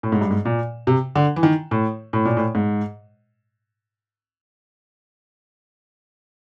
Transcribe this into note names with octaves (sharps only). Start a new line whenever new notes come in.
A2
G#2
G2
G#2
A#2
C3
D3
E3
D#3
A2
A2
A#2
A2
G#2